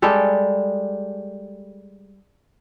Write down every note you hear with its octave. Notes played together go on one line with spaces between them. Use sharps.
G3 G#3 G4 A4